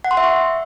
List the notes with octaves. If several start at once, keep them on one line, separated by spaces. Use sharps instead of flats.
F#5
C6
E5
C#6